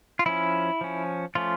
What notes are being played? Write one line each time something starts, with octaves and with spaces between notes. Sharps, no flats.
F4
F3 C#4 E4
F3 C#4
F3 A3 C#4 F4